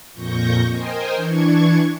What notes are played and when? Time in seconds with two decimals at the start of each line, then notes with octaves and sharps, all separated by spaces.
0.14 F2 A#2 C#6 G6 A#6
0.68 A#4 C5 D#5 G5 G#5
1.15 E3 D4 C#6 G#6